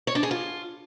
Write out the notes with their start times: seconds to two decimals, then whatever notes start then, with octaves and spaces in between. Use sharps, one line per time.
0.07 C#5
0.15 D4
0.23 G#4
0.31 F4